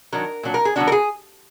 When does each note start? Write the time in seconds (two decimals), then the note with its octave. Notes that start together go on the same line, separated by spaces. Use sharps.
0.12 D#3 F#3 D4 A#4
0.43 A#2 F#3 D4
0.54 A#4
0.65 G#4
0.76 D3 F#3 B3 D4 F#4
0.87 A#4
0.92 G#4